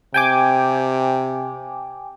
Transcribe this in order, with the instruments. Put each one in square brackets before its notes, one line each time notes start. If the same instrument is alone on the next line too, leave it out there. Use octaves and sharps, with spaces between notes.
[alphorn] C3 [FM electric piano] G5 G#5 D6